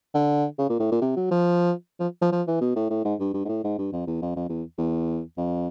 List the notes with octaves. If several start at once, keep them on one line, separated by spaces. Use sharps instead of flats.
D3
C#3
A#2
A2
A#2
C3
F#3
F3
F3
F3
F3
E3
B2
A2
A2
G#2
G2
G2
G#2
A2
G#2
G2
F2
E2
F2
F2
E2
E2
F2